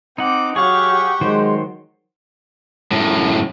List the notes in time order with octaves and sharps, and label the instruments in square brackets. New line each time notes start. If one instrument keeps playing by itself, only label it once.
[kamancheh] C4 D6 [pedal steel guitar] D#4 F#5
[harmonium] F#3 [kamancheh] G4 F#5 [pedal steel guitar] G#4 F5 [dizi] C#6
[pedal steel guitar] D#3 F#3 C5 [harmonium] G#3
[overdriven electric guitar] F#2 A2